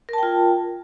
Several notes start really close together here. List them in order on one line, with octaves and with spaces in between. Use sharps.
A#4 A5 G5 F4